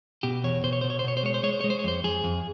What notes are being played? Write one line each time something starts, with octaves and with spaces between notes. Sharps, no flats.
B2 G4
E2 C#5
B2 C5
C#5
B2 C5
C#5
C5
B2 C#5
C5
G#3 C#5
C5
G#3 C#5
C5
G#3 C#5
C5
C#5
F2 C5
F2 G#4
F2